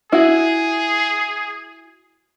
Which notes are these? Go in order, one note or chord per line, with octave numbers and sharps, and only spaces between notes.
E4 F#4 G#4